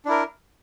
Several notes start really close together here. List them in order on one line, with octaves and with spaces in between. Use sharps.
D4 E4 A#4